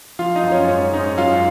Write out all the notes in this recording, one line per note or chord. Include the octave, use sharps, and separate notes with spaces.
F3 F4 F5
D#4 D#5
F#2
C#4 C#5
G#2 C#4 C#5
G#2 D#4 D#5
F#2 F4 F5